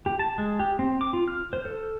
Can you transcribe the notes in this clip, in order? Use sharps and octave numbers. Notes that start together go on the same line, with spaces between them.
G4
A5
G#3
G4
C4
D6
F4
F6
C5
A4